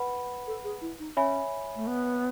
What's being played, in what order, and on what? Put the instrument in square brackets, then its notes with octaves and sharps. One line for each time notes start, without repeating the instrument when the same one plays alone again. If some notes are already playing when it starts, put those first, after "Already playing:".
Already playing: [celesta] B4 F#5 B5
[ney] A4
G#4
E4
D#4
[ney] C#4 [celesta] C#5 E5 G#5 B5
[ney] A3
B3